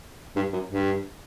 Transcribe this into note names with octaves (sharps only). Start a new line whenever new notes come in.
G2
F#2
G2